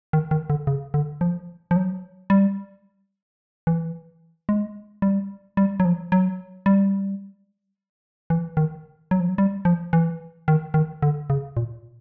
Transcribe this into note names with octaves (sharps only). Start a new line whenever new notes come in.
D#3
D#3
D3
C#3
D3
F3
F3
F#3
G3
E3
G#3
G3
G3
F#3
F3
F#3
G3
E3
D#3
F#3
F3
F#3
G3
F3
E3
D#3
D#3
D3
C#3
A#2